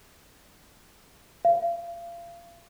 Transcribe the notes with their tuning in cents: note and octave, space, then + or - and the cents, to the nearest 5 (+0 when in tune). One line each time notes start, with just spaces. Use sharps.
F5 -30